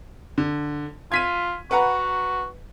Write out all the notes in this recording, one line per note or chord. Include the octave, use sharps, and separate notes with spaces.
D3
F4 G#6 B6 D#7
F#4 B4 F#5 A#5